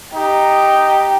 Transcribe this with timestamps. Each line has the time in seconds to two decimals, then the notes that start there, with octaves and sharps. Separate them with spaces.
0.15 D#4 G4